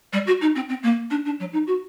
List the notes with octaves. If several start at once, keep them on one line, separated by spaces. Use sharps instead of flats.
G3
F#4
D#4
C4
C4
A#3
D4
D4
F#3
D#4
F#4